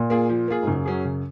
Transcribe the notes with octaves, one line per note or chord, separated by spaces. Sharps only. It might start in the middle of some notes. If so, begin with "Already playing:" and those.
Already playing: A#2
A#3 F4 G#4
F3
A#3 F4 G#4
G#2
F#2 C#3
F#3 C#4 G#4
C#3